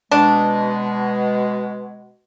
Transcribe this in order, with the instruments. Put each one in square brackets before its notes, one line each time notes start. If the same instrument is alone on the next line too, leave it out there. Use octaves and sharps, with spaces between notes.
[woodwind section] B2 G#3 [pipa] D4